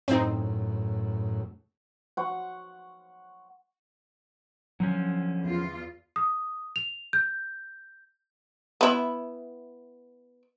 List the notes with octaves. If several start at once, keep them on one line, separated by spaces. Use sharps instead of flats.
F#2 A2 C4 D#4
F#5 C#6
D3 F3 F#3 C#4
E2 F4
D#6
F7
G6
B3 E4